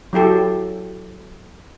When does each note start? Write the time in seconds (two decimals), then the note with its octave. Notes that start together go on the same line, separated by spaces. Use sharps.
0.13 F#3 E4 G4 A4